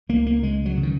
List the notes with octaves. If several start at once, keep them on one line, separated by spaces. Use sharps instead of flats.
C#2 A#3
A#3
C#3 G#3
F#3
C#3
D#3